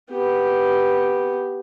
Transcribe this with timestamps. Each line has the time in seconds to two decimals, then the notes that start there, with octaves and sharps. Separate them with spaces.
0.11 B3 G4